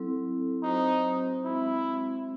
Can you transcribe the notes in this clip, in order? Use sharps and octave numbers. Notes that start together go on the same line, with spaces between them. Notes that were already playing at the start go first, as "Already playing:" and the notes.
Already playing: F#3 C4 E4 A4
F#3 C4 D#4 F#4 C5
G#3 C4 E4 F#4